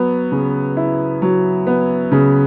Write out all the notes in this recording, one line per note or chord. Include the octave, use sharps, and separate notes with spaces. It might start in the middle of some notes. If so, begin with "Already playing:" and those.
Already playing: F#3 B3
C#3
E4
F#3
B3
C#3